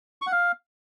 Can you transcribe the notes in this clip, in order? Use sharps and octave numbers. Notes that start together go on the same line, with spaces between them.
C#6
F#5
F5